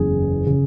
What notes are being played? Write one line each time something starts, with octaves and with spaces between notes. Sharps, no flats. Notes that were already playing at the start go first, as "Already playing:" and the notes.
Already playing: F#1 E2 C#3 G#4
C#3